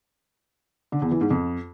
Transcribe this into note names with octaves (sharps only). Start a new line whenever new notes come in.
D3
E2
E3
G#2
F2